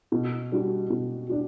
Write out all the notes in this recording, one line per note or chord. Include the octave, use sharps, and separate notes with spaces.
B2
G3 D4 F#4
B2
D4 F#4